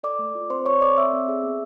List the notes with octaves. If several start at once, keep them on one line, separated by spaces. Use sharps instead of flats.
A4 D5 D6
A3
F4
C4 C5 C6
C4 C#5 C#6
A4 D5 D6
C4 E5 E6
C4
G#4
B3